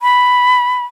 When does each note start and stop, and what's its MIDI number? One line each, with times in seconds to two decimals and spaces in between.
0.01 0.85 83